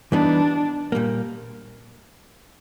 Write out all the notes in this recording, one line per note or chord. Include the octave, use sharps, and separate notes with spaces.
E3 G3 B3 D4 D#4
A#2 G3 A#3